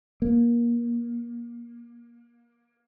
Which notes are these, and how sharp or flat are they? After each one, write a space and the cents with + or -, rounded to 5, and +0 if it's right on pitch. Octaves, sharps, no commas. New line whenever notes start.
A#3 +25